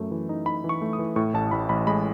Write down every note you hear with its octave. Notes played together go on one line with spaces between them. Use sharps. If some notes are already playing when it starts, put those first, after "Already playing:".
Already playing: F#2 A3
E3
D#4
D#4 B5
E3
C#6
A3
D#6
E3
A2 C#6
A1 A5
A1 B5
A1 B5
G#3 B5